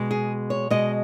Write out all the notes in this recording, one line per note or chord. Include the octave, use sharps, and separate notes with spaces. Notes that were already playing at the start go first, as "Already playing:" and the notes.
Already playing: B2 G#3
G#4
C#5
B2 G#3 D#5